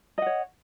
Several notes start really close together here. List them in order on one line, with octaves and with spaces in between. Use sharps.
D#5 F#5 C#5